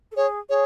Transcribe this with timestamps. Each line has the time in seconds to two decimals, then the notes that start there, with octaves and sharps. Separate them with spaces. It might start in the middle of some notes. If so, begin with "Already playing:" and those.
0.12 A4
0.16 G#4 C#5
0.49 G#4 C#5